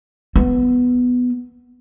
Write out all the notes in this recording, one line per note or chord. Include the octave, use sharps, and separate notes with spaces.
B3